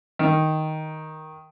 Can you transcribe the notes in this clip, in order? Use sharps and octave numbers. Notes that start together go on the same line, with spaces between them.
D#3